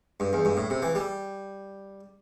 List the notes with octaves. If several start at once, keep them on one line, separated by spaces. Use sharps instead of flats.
G2
E2
G2
A2
C3
E3
G3